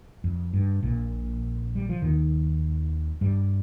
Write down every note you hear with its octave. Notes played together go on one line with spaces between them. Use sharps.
F2
G2
A#1 A#2
G3
F3
D#2 D#3
G2 G3